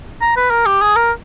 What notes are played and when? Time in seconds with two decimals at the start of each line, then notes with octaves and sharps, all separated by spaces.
0.22 A#5
0.36 B4
0.51 A#4
0.66 G4
0.82 G#4
0.96 A#4